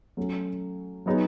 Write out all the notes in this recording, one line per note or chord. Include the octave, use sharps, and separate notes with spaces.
F#3 A3 C#4
F#3 B3 D#4 G#4 C#5